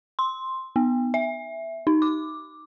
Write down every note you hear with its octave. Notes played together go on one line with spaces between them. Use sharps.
C6
B3
E5
D#4
D6